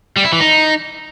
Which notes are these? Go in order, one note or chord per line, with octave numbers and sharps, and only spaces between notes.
G3
E4
E3
D#4